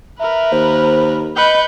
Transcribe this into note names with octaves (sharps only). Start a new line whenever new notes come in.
A#4 B4 E5
D#2 C5
B4 D#5 G6 C#7